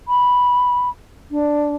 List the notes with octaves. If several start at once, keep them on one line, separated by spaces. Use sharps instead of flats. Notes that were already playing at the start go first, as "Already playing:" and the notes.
B5
D4